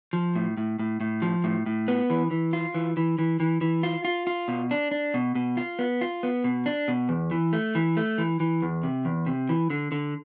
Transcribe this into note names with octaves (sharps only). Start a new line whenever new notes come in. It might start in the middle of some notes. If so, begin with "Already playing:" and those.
F3
A2
A2
A2
A2
F3
A2
A2
B3
E3
E3
F4
E3
E3
E3
E3
E3
F4
F4
F4
B2
D4
D4
B2
B2
F4
B3
F4
B3
B2
D4
B2
E2
E3
A3
E3
A3
E3
E3
E2
C3
E2
C3
E3
D3
D3